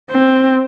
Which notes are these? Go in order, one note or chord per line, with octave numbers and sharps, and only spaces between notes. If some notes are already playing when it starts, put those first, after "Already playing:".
C4